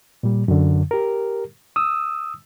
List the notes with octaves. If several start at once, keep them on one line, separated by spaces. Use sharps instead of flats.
A#2 G3
F#2 D3
G4 A#4
D#6 E6